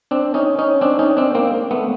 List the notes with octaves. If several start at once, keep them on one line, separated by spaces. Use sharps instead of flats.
C4 D4
C#4 D#4
C#4 D#4
C4 D4
C#4 D#4
C4 D4
A#3 C4
A3 B3